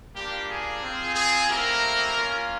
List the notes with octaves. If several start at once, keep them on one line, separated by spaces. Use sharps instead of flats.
G3 A#3 D4 F4 G4
G#4
C4 F4
G#4
A3 A#3 C4 E4 G4 A#4
A#3 C#4 F4